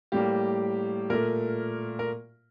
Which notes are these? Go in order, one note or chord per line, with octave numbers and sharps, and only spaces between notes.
A2 G3 A#3 G4
A#2 A3 A#4
A#4